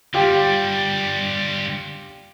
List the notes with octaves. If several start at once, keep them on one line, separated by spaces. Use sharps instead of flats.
D3 G3 F4 G4